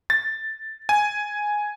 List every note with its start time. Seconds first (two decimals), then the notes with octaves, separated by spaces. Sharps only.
0.10 A6
0.89 G#5